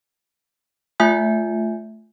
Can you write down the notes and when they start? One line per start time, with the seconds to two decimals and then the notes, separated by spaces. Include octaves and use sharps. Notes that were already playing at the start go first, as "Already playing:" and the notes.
1.00 A3 F4 E5 G#5 G6